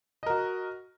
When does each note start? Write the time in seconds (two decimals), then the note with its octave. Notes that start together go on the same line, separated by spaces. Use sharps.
0.23 D#5
0.26 A#4
0.30 F#4